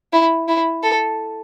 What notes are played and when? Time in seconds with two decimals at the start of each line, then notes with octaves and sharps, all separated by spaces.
0.13 E4
0.48 E4
0.83 A4